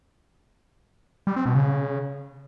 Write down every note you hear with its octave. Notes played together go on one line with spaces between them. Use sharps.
G3
C4
B2
C#3